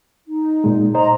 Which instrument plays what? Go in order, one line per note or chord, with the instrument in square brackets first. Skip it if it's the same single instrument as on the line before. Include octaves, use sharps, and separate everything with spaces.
[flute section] D#4
[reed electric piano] A#2 G#3
[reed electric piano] C5 D#5 [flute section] A#5